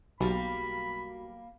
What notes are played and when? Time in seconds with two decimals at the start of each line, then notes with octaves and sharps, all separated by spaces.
0.21 B1 G3 A#3 F#4 F5 B5